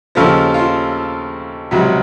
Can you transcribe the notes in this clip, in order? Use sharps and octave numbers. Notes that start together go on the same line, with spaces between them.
D#2 C#3 F3 F4 A4
F4
C#2 C3 F#3